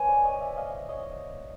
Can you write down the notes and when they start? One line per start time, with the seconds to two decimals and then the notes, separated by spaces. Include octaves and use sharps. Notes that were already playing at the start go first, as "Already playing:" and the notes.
Already playing: B4 C#5 G#5
0.09 C5 D5
0.25 C#5 D#5
0.41 D5 E5
0.57 D#5 F5
0.89 C#5 D#5